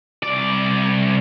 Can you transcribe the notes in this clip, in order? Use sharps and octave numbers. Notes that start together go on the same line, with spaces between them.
C2 D5